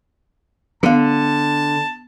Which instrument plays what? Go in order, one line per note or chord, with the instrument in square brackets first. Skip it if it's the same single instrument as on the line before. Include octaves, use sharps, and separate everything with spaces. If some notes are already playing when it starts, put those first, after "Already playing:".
[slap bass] D3 [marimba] B3 F5 [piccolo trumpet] A5